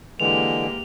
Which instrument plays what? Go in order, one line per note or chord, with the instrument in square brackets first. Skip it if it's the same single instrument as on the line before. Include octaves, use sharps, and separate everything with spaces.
[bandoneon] D3 E3 G#3 [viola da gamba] A#3 G4 [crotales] F7